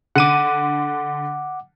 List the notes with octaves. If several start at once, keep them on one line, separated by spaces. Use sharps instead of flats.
D3 F#5 D6 D#7